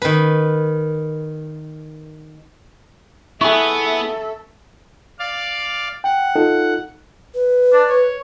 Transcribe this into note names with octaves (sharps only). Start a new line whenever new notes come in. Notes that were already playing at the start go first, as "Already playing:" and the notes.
D#3 B4
B3 E4 G#4 A4 E5 C#6
D5 F5
F#5 G5
D#4 F4 A4
B4
D4
C#5